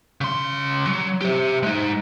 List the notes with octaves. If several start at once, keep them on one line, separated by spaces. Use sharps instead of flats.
C#3 C6
F#3
G4 C5
G#3 D#4